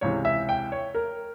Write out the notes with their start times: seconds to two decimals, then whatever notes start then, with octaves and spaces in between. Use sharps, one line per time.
0.01 C#2 C3 E3 C#5
0.25 E5
0.49 G5
0.72 C#5
0.95 A#4